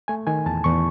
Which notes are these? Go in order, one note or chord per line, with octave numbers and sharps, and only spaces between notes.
A3 G#5
D#3 G#5
E2 A5
E2 C#6